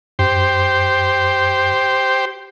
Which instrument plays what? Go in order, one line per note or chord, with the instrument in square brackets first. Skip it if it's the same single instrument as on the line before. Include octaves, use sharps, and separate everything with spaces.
[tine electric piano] F#2 [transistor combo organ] G4 C5